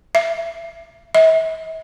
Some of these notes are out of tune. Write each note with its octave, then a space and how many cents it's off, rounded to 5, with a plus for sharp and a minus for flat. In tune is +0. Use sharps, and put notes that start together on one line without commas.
E5 +25
E5 -45